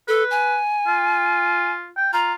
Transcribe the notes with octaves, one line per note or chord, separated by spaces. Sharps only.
A4 B4
G#5
F4
G5
F4 A#5